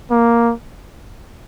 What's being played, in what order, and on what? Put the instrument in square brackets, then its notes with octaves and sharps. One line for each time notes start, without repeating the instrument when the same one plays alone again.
[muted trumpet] A#3